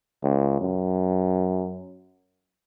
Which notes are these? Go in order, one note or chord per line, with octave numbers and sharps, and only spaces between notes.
C#2
F#2